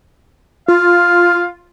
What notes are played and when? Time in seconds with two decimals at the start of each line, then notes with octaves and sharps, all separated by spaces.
0.68 F4 F5